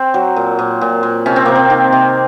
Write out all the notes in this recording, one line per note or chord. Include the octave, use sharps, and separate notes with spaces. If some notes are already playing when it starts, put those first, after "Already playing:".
Already playing: C4
F#3
A#2
A#2
A#2
A#2
C3 C#4
C4
C3 A#3
C4
D#3
C3